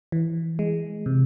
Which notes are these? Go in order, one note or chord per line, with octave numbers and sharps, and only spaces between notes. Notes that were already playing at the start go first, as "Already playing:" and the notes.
E3
G#3
C3